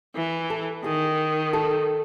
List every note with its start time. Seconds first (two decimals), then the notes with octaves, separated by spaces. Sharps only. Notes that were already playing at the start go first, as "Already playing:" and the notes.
0.15 E3
0.50 A4
0.84 D#3 G#4
1.53 A4